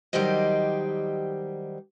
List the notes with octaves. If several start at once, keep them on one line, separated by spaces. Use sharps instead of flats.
D#3 F#3 G3 G4 C5 D#5